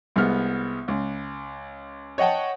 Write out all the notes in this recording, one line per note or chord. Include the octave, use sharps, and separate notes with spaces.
C2 G#3 B3 F6
C#2
C#5 D#5 F#5 G5 A5